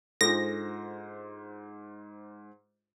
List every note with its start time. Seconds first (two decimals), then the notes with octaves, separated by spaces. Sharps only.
0.21 G#2 D4 F4 A4 C5 A#6